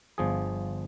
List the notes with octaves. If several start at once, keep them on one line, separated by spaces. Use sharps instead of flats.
G1 F3 G#4